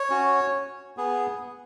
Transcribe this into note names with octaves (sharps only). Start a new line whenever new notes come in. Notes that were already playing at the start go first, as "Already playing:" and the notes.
Already playing: C#5
C#4 F#4
B3 G#4